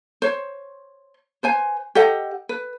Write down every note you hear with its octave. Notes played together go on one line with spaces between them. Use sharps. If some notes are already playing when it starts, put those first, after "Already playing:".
C5 C#5
B4 C5 G#5
G4 A4 D#5 F#5
B4